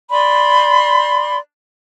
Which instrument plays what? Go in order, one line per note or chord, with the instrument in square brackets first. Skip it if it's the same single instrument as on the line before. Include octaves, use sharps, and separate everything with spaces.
[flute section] D5 B5 C6